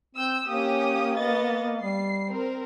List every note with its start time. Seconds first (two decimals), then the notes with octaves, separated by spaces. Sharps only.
0.15 C4 E6 G6
0.47 A#3 C#4 G4 D#6
1.16 B3 D#5 A6
1.82 G3 C7
2.30 C4 A#4